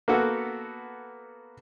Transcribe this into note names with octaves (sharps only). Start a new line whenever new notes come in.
A#3 B3 F#4 A4